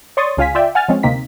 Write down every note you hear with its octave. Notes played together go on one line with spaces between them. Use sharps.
C#5 D5 C6 C#6 D#6 A6
C#2 C#3 F4 F5 G#5 B6
F4 D5 E5 G5
F#5 G#5 F6 A6
F3 G#3 C4 C#4
D2 C3 A#3 C4 D#4 B6